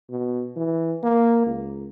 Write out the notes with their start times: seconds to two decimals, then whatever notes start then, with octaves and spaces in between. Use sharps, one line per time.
0.10 B2
0.57 E3
1.04 A#3
1.47 C#2